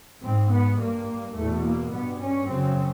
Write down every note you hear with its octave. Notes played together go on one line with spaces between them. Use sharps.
G#2 C4
B3
G2 A#3
E2 B2 A3
A#3
G2 B3
C#4
F#2 C#3 C4